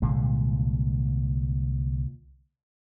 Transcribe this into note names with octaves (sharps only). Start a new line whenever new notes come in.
C2 A#2 D3 G#3